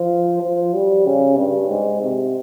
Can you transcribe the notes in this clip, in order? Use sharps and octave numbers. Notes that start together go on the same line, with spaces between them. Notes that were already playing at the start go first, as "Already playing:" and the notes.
Already playing: F3
F3
G3
C#3
G2
G#2
C3